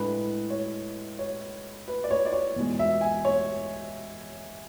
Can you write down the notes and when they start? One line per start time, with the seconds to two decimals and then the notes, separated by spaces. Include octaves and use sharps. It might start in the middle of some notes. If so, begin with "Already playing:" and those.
Already playing: A2 G#3 D4 B4
0.50 C#5
1.19 C#5
1.88 B4
2.04 D5
2.11 C#5
2.25 D5
2.33 C#5
2.56 E2 B2 G#3
2.79 E5
3.01 G#5
3.25 C#5